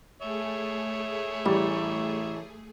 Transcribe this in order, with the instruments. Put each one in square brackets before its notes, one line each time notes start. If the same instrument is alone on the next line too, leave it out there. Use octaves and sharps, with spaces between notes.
[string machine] A3 G#4 [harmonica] C#5 E5
[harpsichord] A1 [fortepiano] G3